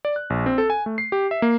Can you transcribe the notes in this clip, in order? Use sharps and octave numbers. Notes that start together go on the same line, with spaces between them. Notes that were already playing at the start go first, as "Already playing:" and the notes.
D5
F#6
A#1
C4
A4
G#5
A3
C7
G4
E5
A#3